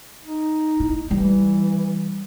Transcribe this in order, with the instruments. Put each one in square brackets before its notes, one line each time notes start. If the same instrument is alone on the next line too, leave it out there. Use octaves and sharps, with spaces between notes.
[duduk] D#4
[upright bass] E4
[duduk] E3 [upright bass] G3